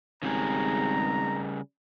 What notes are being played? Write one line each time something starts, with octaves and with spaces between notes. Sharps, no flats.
G#1 C#3 G3 G#4 A#5